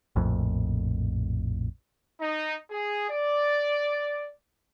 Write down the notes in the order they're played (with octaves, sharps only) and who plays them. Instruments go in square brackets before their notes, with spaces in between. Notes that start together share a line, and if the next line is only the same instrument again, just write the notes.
[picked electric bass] A#1 F2 A2
[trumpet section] D#4
G#4
D5